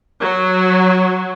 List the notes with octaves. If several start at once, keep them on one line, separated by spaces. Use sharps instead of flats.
F#3